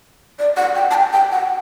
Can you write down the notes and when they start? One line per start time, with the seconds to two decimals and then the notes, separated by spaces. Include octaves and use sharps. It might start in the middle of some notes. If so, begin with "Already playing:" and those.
0.39 D5
0.57 F#5
0.75 G5
0.91 A5
0.94 G5
1.13 G5
1.32 F#5